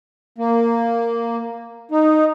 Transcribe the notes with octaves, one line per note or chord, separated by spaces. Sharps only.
A#3
D#4